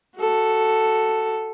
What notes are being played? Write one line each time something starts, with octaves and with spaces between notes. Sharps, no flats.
F#4 A4